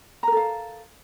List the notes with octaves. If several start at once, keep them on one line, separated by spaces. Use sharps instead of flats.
A4 A#4 F5 A#5